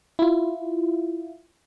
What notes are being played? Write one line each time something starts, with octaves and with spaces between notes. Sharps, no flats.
E4 F4